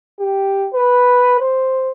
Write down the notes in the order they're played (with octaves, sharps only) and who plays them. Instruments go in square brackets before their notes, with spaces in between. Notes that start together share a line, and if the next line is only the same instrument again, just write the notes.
[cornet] G4
B4
C5